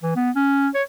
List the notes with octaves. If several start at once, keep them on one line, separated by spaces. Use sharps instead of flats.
E3
B3
C#4
C#5